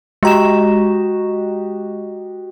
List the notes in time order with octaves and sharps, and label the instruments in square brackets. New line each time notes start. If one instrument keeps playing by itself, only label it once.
[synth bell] G#3 A#5 E7 [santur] F#4 G4 D#5